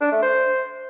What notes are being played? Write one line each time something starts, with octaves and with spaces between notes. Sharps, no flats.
D4
A3
C5